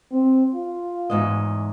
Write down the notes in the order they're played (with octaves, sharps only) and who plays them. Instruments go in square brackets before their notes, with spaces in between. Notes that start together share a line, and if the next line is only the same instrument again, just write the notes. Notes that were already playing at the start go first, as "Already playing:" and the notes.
[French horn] C4
F4
[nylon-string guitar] E2 G#2 D#5